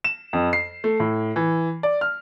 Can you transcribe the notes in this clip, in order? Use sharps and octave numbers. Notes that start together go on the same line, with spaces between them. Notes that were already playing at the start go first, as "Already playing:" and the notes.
E7
F2
C7
A3
A2
E3
D5
F6